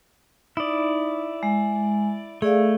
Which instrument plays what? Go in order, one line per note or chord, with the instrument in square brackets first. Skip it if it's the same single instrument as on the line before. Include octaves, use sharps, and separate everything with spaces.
[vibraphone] D#4 [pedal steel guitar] E4 D5
[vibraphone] G#3
[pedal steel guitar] A3 [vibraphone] G#4 D5 F5